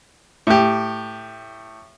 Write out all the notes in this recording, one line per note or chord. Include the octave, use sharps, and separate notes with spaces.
A2 G4